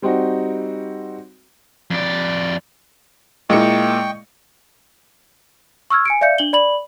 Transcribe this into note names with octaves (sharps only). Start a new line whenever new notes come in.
G3 C4 D#4 F#4
F2 D5
A#2 G#3 A#3 E4 D#5 G5 C#6 C#7
C#6 E6 F6 G#6
G#5 C#7 D7
D5 E5 F5 G6 C#7
D4 F#7 G7
D5 B5 F#7